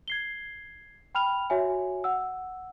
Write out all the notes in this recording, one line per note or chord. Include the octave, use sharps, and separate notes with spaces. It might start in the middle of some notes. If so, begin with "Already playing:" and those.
G#6 C7 G7
G5 B5 F6 F7
F#4 C#5 E5 G#5
F#5 E6